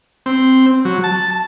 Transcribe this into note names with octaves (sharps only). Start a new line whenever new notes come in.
C4
F#3
A5